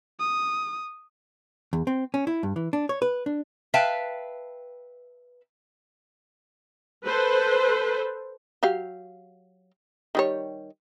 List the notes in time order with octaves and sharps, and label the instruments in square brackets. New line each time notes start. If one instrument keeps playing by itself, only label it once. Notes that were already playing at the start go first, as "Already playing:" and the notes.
[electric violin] D#6
[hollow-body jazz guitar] E2
C4
C#4
E4
G2
E3
D4
C#5
B4
D4
[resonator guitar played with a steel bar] B4 E5 F5 G5 A5
[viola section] A4 B4 C5
[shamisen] F#3 G4 F5
D#3 G3 C#5